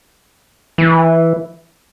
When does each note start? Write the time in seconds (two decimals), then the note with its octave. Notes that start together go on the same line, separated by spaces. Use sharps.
0.78 E3